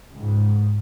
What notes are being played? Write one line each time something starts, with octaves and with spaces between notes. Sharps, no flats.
C#2 G#2